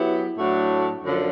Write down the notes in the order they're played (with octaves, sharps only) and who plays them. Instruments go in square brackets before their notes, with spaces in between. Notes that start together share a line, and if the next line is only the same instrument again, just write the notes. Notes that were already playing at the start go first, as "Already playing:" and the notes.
Already playing: [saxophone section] F#3 B3 E4 G4
A2 F#3 A3 D4 F#4
F#2 D3 F3